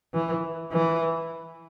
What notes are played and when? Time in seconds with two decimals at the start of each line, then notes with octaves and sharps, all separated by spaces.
0.14 E3
0.73 E3